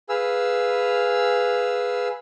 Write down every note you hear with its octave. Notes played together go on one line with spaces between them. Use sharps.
G#4 B4 F5 E6